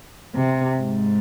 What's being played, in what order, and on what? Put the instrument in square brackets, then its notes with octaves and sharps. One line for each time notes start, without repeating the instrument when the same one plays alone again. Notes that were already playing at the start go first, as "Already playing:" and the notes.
[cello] C3
G#2